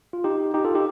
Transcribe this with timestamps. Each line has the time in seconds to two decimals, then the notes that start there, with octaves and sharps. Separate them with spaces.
0.13 F4
0.24 D#4 G4
0.54 D#4 G4
0.65 F4 A4
0.75 D#4 G4